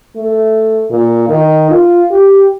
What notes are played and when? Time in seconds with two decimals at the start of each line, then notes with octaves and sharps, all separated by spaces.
0.16 A3
0.91 A#2
1.28 D#3
1.71 F4
2.11 G4